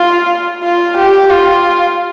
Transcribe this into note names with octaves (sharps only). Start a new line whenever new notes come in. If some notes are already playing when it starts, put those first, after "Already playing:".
Already playing: F4
F4
G4
F4